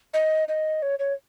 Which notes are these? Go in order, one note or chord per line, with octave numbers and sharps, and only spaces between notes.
D#5
D#5
C#5
C#5